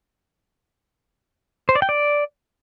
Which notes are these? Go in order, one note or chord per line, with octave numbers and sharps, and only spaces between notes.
C5
D5
G5
D5